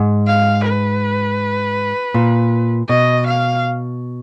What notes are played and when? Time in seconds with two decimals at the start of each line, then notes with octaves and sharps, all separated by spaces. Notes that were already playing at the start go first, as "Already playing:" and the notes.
Already playing: G#2
0.27 F5
0.65 B4
2.14 A#2
2.89 B2 D#5
3.27 F5